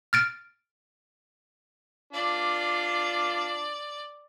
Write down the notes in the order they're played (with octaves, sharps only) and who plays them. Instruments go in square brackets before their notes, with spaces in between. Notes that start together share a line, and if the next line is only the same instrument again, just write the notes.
[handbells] F6 A6 D7
[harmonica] D4 F4 [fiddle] D5